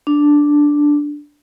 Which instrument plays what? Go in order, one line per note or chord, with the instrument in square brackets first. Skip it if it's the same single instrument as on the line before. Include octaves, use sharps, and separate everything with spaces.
[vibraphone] D4